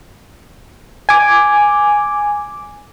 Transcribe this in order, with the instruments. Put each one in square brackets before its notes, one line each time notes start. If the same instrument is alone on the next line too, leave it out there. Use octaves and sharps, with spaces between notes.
[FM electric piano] G#5 D6